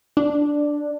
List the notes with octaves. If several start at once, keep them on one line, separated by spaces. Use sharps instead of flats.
D4